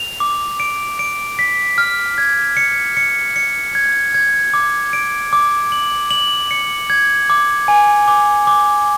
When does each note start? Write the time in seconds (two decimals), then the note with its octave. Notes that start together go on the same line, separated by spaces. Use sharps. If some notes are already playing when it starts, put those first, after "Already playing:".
Already playing: F7
0.20 D6
0.60 D7
0.99 D7
1.39 B6
1.78 F6
2.18 G#6
2.57 C#7
2.97 C#7
3.36 C#7
3.75 G#6
4.14 G#6
4.54 D6
4.93 D7
5.33 D6
5.72 F#7
6.11 F#7
6.51 C#7
6.90 G#6
7.30 D6
7.68 G#5
8.08 D6
8.47 D6